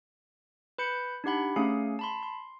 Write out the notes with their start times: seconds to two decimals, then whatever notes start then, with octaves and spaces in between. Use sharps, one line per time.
0.78 B4 B5 G6 C#7
1.24 D4 D#4 G4 F#5 B5
1.56 A3 C#4 G#4 F5 G#5
1.99 A5 B5 C6
2.23 C6